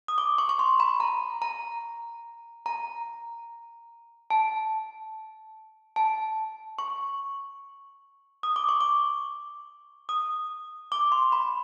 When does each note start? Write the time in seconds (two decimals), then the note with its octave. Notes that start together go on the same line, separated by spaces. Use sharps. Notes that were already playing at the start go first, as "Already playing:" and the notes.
0.08 D#6
0.18 D6
0.38 C#6
0.49 C#6
0.59 C6
0.80 B5
1.00 A#5
1.42 A#5
2.66 A#5
4.30 A5
5.96 A5
6.79 C#6
8.43 D#6
8.56 D6
8.69 C#6
8.81 D6
10.09 D#6
10.92 D6
11.12 C6
11.32 B5